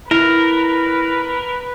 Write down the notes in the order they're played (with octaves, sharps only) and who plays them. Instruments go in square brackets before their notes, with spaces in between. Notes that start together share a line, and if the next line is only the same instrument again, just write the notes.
[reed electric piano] E4 [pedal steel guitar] A#4 [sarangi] B4